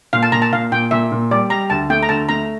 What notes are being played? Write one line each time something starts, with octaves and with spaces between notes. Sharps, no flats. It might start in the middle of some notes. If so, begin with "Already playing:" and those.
A#2 F5
A5
A#2 A#5
A5
A#2 F5
A#2 G5
A#2 E5
A#2
G3 D5
G3 A#5
D2 A5
A3 G5
A#5
D2 A5
A3 A#5